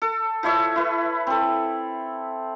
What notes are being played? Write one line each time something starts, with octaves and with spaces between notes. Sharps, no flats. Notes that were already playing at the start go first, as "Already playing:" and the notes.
A4
F3 E4 C#5 E5
E4 B4
C4 A4